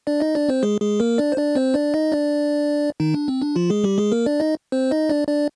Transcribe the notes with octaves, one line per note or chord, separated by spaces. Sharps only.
D4 D5
D#4 D#5
D4 D5
C4 C5
G#3 G#4
G#3 G#4
A#3 A#4
D4 D5
C5
D4 D5
C4 C5
D4 D5
D#4 D#5
D4 D5
D#3 D#4
D4
C4
D4
F3 F4
G#3 G#4
G3 G4
G#3 G#4
A#3 A#4
D4 D5
D#4 D#5
C4 C5
D#4 D#5
D4 D5
D4 D5